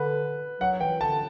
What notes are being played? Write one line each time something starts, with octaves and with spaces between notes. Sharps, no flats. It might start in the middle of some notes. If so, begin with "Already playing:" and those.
Already playing: D3 B4
F#3 F#5
E3 G5
D3 A5